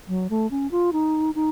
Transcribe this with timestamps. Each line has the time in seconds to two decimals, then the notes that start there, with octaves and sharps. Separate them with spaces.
0.08 F#3
0.30 A3
0.51 C#4
0.71 F4
0.93 D#4
1.35 D#4